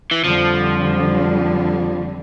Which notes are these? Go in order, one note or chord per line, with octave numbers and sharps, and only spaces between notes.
E3
F2 D3 F3 G3